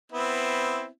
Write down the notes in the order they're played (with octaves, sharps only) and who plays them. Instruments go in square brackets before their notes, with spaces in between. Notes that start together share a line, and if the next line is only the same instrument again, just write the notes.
[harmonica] B3 C4 E4